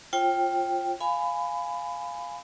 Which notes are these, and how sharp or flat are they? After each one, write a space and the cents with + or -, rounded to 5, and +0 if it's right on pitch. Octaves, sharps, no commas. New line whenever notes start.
F4 +0 C5 +40 G5 +0
F5 +0 G#5 +0 B5 +20